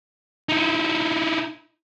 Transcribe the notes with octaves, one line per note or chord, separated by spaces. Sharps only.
D#4 E4